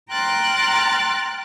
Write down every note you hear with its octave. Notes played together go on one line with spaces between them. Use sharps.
G5 A#5 C6 F6 F#6 A6